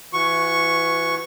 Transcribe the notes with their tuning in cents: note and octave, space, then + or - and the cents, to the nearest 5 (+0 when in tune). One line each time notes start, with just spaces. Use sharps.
E3 +25 F#4 -15 C#6 +0